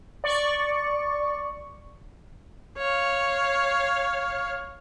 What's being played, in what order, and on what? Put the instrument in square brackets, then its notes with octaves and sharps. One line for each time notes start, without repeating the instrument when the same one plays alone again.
[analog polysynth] D5 C#6
[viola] C#5 F5